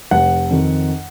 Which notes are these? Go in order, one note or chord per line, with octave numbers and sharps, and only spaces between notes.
F1 F#5
F2 D#3